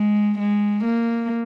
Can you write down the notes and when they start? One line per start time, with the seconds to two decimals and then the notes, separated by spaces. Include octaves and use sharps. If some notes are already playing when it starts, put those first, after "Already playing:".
Already playing: G#3
0.39 G#3
0.85 A#3